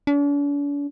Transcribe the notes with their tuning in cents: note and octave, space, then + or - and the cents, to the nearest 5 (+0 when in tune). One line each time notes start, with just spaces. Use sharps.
D4 -45